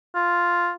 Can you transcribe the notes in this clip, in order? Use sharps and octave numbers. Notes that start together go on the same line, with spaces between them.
F4